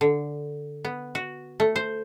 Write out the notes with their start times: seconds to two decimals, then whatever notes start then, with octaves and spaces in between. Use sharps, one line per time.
0.01 D3
0.85 B3
1.15 F#4
1.60 A3
1.76 C5